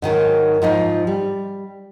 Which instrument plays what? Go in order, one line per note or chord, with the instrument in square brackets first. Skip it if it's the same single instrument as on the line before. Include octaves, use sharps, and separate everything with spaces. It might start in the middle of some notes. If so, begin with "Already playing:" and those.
[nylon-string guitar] G#2 D#3 F3 F#3
G#2 F3 D#4 F4
G3